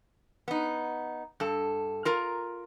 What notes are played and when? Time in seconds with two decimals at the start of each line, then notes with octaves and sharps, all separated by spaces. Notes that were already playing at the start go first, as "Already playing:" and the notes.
0.48 B3 D#4
1.40 G2 A4
2.05 F4 A#4 A#5